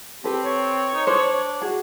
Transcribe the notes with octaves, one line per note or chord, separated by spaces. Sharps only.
C4 G4 A4 B4
C#5
D#4
D4 C5
F#4 G#4